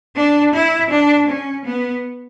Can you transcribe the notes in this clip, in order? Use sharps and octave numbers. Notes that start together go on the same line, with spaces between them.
D4
E4
D4
C#4
B3